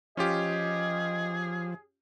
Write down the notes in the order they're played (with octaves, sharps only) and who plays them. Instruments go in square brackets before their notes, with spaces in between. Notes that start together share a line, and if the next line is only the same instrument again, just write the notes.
[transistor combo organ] F3 [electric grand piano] C#4 F4 G4 [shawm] G#4 [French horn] D#5